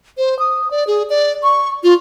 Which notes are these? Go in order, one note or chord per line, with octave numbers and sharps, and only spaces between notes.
C5
D#6
D5
G#4
D5
C#6
F4